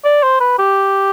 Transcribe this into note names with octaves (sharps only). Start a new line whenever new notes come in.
D5
C5
B4
G4